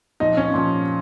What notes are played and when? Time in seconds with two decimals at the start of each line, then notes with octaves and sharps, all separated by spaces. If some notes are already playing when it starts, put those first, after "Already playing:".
0.20 A#2 F3 D#4
0.37 C#4
0.54 A#2 F3